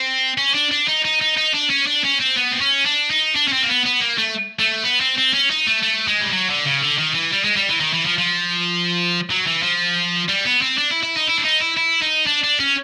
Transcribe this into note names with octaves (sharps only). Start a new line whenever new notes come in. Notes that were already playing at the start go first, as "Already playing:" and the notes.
Already playing: C4
C#4
D4
D4
D#4
D#4
D#4
D#4
D4
C#4
D4
C#4
C4
B3
C4
C#4
D4
D#4
D4
C#4
C4
A#3
B3
B3
A#3
A3
A3
B3
C4
C4
C#4
D#4
A3
A3
G#3
G3
F#3
D3
C#3
D3
D#3
E3
G3
G#3
G3
E3
D#3
E3
F3
F3
F#3
E3
F3
G3
B3
C4
D4
E4
E4
D#4
E4
D4
D#4
E4
E4
D#4
D4
D4
C#4